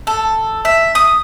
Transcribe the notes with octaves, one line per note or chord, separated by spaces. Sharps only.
A4
E5
D#6